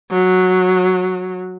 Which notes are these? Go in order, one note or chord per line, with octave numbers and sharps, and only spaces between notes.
F#3